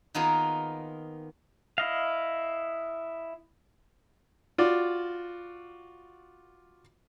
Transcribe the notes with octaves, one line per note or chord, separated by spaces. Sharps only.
D#3 A#3 B3 D#4 F4 G#4
E4 D#5 F5
F4 F#4 D5